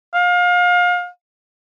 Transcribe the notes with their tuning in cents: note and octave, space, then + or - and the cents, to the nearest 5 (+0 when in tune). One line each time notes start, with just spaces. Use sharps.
F5 +30